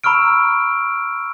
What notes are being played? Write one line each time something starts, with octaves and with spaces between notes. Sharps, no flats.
A#5 B5 C#6 E6 F6 D7